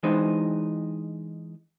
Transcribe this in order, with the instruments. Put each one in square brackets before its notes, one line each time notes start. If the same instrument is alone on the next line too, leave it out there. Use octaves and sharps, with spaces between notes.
[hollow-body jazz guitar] E3 G#3 D4 D#4 C5